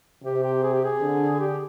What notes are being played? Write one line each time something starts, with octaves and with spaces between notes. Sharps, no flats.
C3 G4
G4
G#4
G4
G#4
D3
G4